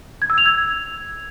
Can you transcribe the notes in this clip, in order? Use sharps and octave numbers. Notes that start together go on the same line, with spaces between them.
G#6
E6
F7
G#6